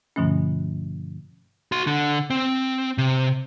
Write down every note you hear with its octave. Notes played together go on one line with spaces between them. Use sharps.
G2 B2 D3 F3 A3 C#4
F#4 C6
D3
C4
C3